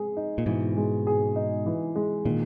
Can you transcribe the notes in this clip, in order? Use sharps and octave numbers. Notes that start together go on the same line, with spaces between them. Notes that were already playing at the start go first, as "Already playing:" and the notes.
Already playing: G#3 G#4
D#4
A#2
G#2 B2 E3
G#3
G#4
D#4
E3
G#3
A#2 D#3